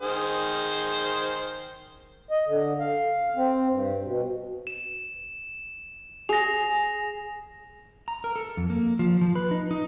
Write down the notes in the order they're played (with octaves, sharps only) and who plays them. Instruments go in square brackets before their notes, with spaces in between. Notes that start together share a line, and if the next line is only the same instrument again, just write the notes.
[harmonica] D#3 G#4 C5
[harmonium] D#5
D3
F5
C4
G2
B2
[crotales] E7
[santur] G#4 [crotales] A#6 F7
[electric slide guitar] A#5
A#4
A4
F2
A#3
F3
F3
B4
D#4
D#4